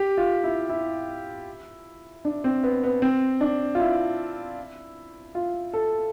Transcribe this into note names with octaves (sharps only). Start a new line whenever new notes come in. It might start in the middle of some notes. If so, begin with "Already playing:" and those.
Already playing: G4
F4
E4
E4
D4
C4
B3
B3
C4
D4
F4
E4
F4
A4